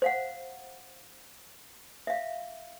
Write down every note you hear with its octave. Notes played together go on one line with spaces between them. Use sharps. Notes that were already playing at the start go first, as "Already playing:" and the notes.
C5 F5 F#5
E5 F5